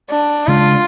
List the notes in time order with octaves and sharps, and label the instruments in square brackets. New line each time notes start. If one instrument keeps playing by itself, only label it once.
[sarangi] D4
[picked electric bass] C#3 G#3 D4 [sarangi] F4